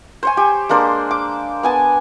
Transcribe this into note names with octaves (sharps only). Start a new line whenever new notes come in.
C5 C#5 G#5
G4
G#3 A#3 D4 C5
D6
B3 G#5 A5